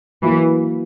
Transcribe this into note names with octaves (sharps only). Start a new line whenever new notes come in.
E3 F#3 A#3 E4